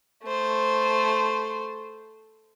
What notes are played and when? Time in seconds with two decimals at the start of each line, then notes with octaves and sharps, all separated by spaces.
0.23 A3 C5